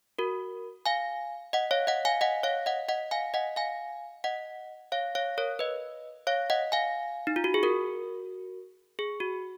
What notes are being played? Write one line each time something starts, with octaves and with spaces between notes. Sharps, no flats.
F#4 A#4
F5 G#5
D#5 F#5
C#5 F5
D#5 F#5
F5 G#5
D#5 F#5
C#5 F5
D#5 F#5
D#5 F#5
F5 G#5
D#5 F#5
F5 G#5
D#5 F#5
C#5 F5
C#5 F5
A#4 C#5
B4 D#5
C#5 F5
D#5 F#5
F5 G#5
D#4
F4
F#4
G#4
F#4 A#4
G#4
F#4